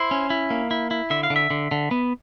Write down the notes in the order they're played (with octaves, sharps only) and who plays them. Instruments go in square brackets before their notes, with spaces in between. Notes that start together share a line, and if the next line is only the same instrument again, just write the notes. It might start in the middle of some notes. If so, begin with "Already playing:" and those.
Already playing: [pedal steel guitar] E4 C5
C#4
E4
A#3
E4
E4
D3 E5
F5
D3
E5
D3
D3
B3